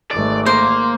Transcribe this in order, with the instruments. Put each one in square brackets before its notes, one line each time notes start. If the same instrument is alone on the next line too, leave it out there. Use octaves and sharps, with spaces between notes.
[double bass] G#1 A3 [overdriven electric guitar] D5
[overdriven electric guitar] A#3 [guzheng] C5